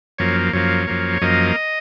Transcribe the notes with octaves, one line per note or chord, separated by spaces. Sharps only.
F#2 F3 A#3 C#5
F#2 F3 A#3 C#5
F#2 F3 A#3
F#2 F3 A#3 D#5